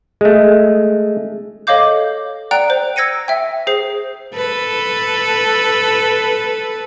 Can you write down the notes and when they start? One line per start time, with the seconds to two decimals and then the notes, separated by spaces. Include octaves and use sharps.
0.21 G#3 A3
1.67 A4 C#5 D#5 F5 D6 G6
2.51 D5 F#5 G5 A#5 F#6 D7
2.70 C5
2.96 E6 G#6 A#6 C#7 D#7
3.28 E5 G5
3.67 G#4 C5 C7
4.34 A4 B4